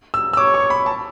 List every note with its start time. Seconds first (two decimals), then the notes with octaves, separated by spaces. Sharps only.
0.14 E6
0.33 E6
0.37 C#5 D6
0.54 C#6
0.70 B5
0.86 A5